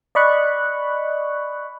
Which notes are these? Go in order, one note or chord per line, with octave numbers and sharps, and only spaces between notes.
D5 D#5 B5 C#6 F#6